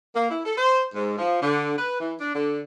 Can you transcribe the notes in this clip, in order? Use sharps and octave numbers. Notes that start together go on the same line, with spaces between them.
A#3
E4
A4
C5
G#2
F3
D3
B4
E3
D4
D3